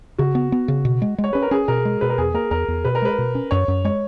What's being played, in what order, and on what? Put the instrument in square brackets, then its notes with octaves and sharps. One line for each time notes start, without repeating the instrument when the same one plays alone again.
[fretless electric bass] C#3 [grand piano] F#4
[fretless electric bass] B3
B3
C#3
B2
G#3
G#3
[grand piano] C#5
[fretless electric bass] C#4 [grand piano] B4
[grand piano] A#4
[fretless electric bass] C#4 [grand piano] G#4
[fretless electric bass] B2 [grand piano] A#4
[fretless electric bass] G#3
[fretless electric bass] B2 [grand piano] B4
[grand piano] A#4
[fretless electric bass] E2 [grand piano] G#4
[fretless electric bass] A#3 [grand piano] A#4
[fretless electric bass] E2 [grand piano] A#4
[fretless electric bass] E2
[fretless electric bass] B2 [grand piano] B4
[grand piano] A#4
[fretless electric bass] G#3 [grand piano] B4
[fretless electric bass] B2
C#4
[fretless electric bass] F#2 [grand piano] C#5
[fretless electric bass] F#2
[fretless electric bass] G#3 [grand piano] C#5